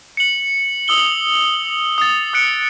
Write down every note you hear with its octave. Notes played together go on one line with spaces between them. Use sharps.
C#7 F#7
D#6 E6 G7
D#6 A6
D#6 F#6 C#7 D7